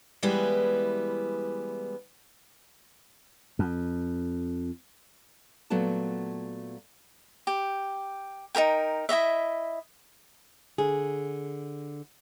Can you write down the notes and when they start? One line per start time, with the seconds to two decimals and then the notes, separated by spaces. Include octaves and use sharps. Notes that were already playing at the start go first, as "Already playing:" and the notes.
0.23 E3 G3 G#3 B3 E4
3.59 F2
5.70 A#2 F#3 A3 B3 A5
7.47 G4
8.55 D#4 G4 A#4 G5
9.09 E4 F#4 D#5 E5
10.78 D3 G#4